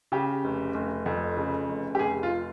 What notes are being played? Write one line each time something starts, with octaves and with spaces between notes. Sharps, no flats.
C#3 G4
F1
F1
F2
C#3
F1
G4
F1 G#4
F4